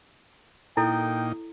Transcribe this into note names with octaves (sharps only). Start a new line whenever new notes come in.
A#2 D#4 E4 A4 G5